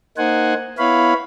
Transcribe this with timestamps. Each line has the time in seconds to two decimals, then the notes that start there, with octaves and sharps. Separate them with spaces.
0.18 A#3 D#4 C5 F#5 G#5
0.78 B3 E4 B4 C#5 F5 B5